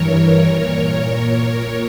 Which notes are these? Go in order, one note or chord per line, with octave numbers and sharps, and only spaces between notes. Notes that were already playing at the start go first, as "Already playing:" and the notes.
Already playing: G2 E3 A#4 C#5
A#2